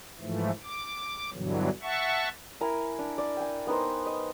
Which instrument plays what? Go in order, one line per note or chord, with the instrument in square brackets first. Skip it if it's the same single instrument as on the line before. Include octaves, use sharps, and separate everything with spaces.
[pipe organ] G#2 E3 F3 A3
D6
G2 B2 D3 E3 F#3
E5 F#5 A5 C#6
[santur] E4 A#4 G#5
D4
D5
G5 G#5
B3 D#4 A#4 C5
D#5